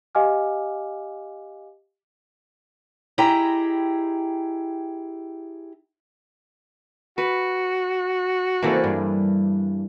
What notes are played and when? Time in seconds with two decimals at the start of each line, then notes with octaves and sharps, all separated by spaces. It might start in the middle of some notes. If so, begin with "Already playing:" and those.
0.15 G4 D#5 F5 G#5 D6 F6
3.18 E4 G4 G#4 D#5 G5 A#5
7.18 F#4 B4
8.62 C#3 E3 A3 A#3 C4 D5
8.84 G2